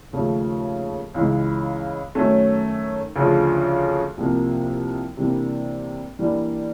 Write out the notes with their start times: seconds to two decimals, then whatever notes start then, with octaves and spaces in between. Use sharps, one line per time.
0.13 D#2 C#3 F3 A3
1.14 C#2 C#3 E3 G#3
2.15 F#2 D#3 F#3 A3 C#4
3.16 D2 C#3 F3
4.17 C2 C3 F3 A#3
5.17 C3 E3 G3 A#3 D4
6.19 E3 G3 A#3 D4